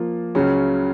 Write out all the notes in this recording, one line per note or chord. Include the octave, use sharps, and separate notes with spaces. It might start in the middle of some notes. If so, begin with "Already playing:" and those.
Already playing: F3 A#3 F4
C#2 C#3 F#3 C#4